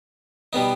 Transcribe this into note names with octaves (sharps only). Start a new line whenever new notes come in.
B2 G3 B3 D#4